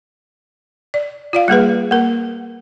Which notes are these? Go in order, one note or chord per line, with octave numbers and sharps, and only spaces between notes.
D5
F4 D5 F5
G3 A#3 G#4 B4
A#3 A#4